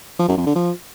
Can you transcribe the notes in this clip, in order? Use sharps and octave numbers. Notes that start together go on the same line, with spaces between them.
F3
F#2
F2
D3
F3